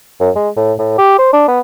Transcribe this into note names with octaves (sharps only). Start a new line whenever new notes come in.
F#2
G#3
A2
A2
G4
C5
D4
B3